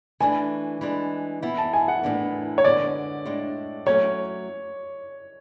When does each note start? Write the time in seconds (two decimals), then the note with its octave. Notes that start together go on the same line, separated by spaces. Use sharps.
0.20 E3 A3 D4 G#5
0.81 E3 G#3 D4
1.42 E3 B3 E4
1.58 A5
1.73 G#5
1.88 F#5
2.03 A2 E3 B3 D4
2.58 C#5
2.64 D3 G#3 B3 D5
3.26 A2 G#3 D4
3.86 F#3 A3 C#4 C#5